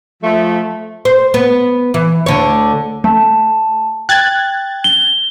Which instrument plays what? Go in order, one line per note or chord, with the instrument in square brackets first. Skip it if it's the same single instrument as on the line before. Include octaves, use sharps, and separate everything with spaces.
[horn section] F3 A3
[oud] C5
B3
E3
D2 D3 C#5
[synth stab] A3 [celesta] A5
[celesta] G5 [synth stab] F#6 G#6 A6
[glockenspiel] G7